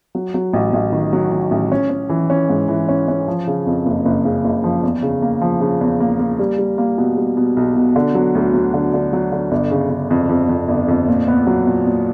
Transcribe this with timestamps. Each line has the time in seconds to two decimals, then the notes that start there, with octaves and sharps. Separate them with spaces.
0.15 F#3
0.34 F#3
0.53 A1
0.73 A1
0.92 D#3
1.13 F#3
1.31 D#3
1.51 A1
1.72 C#4
1.90 C#4
2.10 E3
2.30 C#4
2.49 G#2
2.68 E3
2.89 C#4
3.08 C#4
3.28 F3
3.47 C#3
3.66 F2
3.86 F#1
4.05 F#1
4.25 C#3
4.44 F#1
4.64 F3
4.83 E2
5.02 C#3
5.22 A#3
5.42 F3
5.61 C#3
5.81 E2
6.00 A#3
6.19 A#3
6.39 G3
6.58 G3
6.78 A#3
6.98 B2
7.17 G3
7.37 B2
7.57 B1
7.76 B2
7.96 D3
8.15 F#3
8.35 D2
8.54 F#3
8.74 D3
8.94 D3
9.13 F#3
9.32 D3
9.51 G1
9.71 C#3
9.90 C#3
10.10 F2
10.29 F2
10.49 F2
10.68 G1
10.88 F2
11.08 A#2
11.28 B3
11.47 F#3
11.67 A#2
11.86 A#2